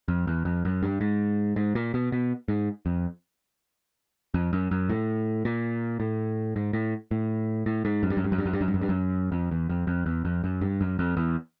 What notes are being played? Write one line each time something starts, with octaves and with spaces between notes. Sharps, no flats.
F2
E2
F2
F#2
G2
G#2
G#2
A#2
B2
B2
G#2
F2
F2
F#2
F#2
A2
A#2
A2
G#2
A2
A2
A2
G#2
F#2
G2
F#2
G2
F#2
G2
F#2
G2
F#2
G2
F#2
G2
F#2
F2
E2
F2
F2
E2
F2
F#2
G2
F#2
F2
E2